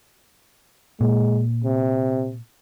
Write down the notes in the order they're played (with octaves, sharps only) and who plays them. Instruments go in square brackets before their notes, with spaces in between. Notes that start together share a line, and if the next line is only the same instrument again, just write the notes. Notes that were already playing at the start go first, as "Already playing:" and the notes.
[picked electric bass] A#2 [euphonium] G#3
[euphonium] C3